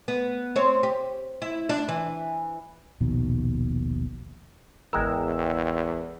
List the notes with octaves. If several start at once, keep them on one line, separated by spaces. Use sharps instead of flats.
B3
C4 C#5
G4
E4
D4
E3
D#1 A#1 B2 D#3
G#1 E2 G#3 A#4 G5 E6